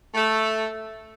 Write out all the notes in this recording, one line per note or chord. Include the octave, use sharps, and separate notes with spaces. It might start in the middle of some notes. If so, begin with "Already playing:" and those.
A3